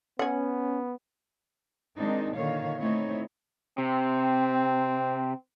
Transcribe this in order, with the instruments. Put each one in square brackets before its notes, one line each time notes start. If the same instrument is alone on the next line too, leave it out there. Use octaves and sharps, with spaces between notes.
[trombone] B3 [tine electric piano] C#4 [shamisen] F#5 G#5
[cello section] D#3 G#3 C4 D4 D#4
A#2 D3 D#3 C#5 F5
A3 C4 D#4 E4 C#5
[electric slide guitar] C3 [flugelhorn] C4